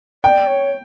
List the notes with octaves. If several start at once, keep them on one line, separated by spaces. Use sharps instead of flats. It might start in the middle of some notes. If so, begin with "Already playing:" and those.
D5 G5
C#5